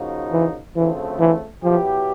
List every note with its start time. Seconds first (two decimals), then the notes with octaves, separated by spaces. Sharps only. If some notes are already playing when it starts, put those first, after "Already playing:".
Already playing: C#3 F3 A#3 D#4 F#4
0.32 E3
0.76 D2 C#3 E3 F3 A3 C4
1.19 E3
1.63 B2 F3 F#3 B3 E4 G4